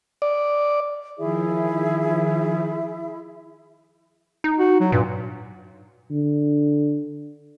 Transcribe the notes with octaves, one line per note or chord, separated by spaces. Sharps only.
D5
D#3 F3 E4 G#4 E5
D#4
F#4
F#3
G2 A#2
D3